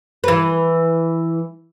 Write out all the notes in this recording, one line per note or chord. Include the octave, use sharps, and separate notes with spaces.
E3 B4